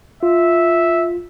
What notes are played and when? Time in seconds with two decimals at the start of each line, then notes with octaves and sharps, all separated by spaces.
0.23 F4 E5